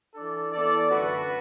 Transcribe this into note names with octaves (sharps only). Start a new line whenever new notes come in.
E3 D4 A4 D5
E3 B3 E4 A4 D5
F#2 D3 A3 F#4 B4